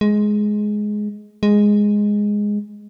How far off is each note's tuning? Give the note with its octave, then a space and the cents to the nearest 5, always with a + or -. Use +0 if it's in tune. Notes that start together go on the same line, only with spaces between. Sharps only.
G#3 +10
G#3 -5